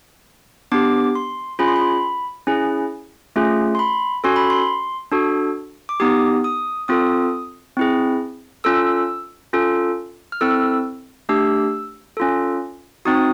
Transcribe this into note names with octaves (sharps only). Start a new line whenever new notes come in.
B3 D4 G4 D6
C6
C#4 F4 G#4 B5
C6
B5
C#4 E4 G#4
A3 C#4 F4 G#4
C6
B5
C#4 F#4 A4 C6
B5
C6
D4 F#4 A4
D6
B3 D#4 G4 D#6
D#6
C4 F4 A4 D#6
C4 E4 G#4
C#4 F4 A4 E6
C#4 F4 A4
F6
C4 E4 A4 E6
A3 D4 G4 E6
C#4 F4 A4
C4 D#4 F#4 D#6